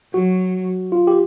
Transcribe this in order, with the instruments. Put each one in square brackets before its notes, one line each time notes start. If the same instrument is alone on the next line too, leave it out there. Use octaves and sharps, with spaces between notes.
[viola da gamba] F#3 [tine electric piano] F#4
[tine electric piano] F4
G4